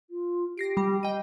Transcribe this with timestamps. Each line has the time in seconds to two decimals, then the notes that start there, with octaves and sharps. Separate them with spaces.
0.10 F4
0.58 G4 A#6 C7 D7
0.77 G3
1.03 D#5 G5 D#7